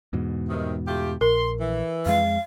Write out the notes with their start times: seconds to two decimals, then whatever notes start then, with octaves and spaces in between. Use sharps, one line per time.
0.13 E2 G#2 B2
0.49 G2 C3 D#3
0.87 A3 F4 G4
1.21 A#1 A#4 C6
1.60 E3
2.06 F2 G#3 F5